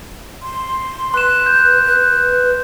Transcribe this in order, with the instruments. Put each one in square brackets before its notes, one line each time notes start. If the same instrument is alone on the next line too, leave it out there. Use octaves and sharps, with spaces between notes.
[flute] C6
[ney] B4 [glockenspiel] C6 E7 [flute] F#6
[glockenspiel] G6
[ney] B4